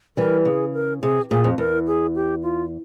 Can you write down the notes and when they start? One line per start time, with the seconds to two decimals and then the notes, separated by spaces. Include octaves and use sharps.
0.17 E3 G3 A#4
0.45 C#3 G#4
0.74 A#4
1.02 C3 G#4
1.30 A#2 G#4
1.44 F2
1.58 E2 A#4
1.87 G#4
2.15 G4
2.43 F4